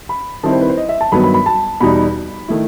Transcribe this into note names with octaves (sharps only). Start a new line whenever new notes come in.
B5
D#3 G3 C4 E4 A5
C5
B4
C5
D#5
E5
A5
G2 D#3 F#3 B3 B5
B5
B5
A5
E2 B2 G3 D#4 B5
D#3 A3 E4